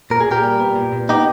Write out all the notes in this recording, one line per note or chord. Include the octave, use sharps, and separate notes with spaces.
A#2 A#4
G#4
A#2 G4 A#4
G3
B3
A#2
A#2
B3 D#4 G4